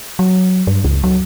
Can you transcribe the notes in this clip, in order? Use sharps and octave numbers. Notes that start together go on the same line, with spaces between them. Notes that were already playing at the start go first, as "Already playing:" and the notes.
F#3
G2
C#2
F#3